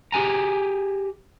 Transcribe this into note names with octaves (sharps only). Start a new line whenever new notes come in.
G4 G#4 G#5 A#5